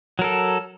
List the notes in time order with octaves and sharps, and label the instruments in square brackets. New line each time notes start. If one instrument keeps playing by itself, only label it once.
[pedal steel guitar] F#3
A#4
A4